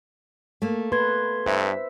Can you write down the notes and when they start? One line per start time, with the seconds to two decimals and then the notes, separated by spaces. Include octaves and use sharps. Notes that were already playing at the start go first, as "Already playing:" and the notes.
0.62 A3 A#3
0.92 B4 C6 G#6
1.46 G2 C5 E5